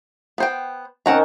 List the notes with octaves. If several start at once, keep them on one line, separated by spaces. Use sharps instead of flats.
B3 C5 G5
D#3 C4 C#4 D#4 F#5 A#5